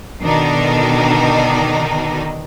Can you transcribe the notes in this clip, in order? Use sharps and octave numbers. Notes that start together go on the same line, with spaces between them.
B2 D3 D#3 D4 D#4